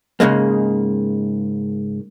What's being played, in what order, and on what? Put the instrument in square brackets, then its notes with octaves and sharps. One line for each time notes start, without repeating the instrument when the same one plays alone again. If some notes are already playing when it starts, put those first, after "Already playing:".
[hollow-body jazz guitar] G#2 C#3 G#3 A#3